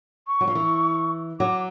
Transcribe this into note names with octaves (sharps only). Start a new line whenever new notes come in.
C#6
F#3
F3
E3
F#3 D6